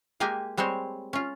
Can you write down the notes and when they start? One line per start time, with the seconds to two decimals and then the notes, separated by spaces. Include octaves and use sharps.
0.20 G#3 A#3 G4 G#5
0.57 G3 G#3 C4 C5 C#5
1.13 C#4 F4